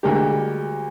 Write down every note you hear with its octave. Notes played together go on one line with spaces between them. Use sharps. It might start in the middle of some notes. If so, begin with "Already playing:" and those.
D2 G3 G#3 A#3 G4